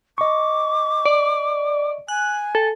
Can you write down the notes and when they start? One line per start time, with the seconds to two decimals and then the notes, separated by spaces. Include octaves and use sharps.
0.18 D#5 C#6 D6
1.05 D5
2.08 G#5 F#6
2.55 A4